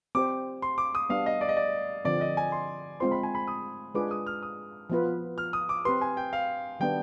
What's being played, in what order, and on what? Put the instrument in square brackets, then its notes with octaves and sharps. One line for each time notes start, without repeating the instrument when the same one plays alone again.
[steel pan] C4 G4 C5 [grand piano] D6
[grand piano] C6
D6
D#6
[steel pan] G3 B3 D4 [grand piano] F5
[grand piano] D#5
D5
D#5
D5
[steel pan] D3 F3 C4 [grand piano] D5
[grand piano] D#5
G#5
C6
[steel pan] G#3 C4 F4 C5 [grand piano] C6
[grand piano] B5
G#5
B5
D#6
[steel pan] G#3 D4 F4 G#4 B4 [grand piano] D6
[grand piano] D#6
F6
D#6
[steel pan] F3 B3 F4 B4
[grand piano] F6
D#6
D6
[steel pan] C4 G4 B4 [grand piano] C6
[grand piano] G#5
G5
F5
[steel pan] D#3 G3 B3 D4 [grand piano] G5